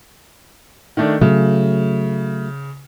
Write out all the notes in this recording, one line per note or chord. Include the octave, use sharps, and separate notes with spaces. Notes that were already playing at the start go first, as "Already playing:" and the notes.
D#3 A3 D4
C#3 F#3 A3